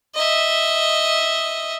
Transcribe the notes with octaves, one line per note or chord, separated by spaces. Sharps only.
D#5 E5